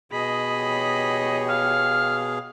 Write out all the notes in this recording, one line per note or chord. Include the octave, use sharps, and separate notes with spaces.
B2 G#4 D#5 B5
G4 C#5
F5 F6